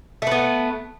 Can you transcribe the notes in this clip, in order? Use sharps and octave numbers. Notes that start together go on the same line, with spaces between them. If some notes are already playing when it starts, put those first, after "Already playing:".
A3 B3 B4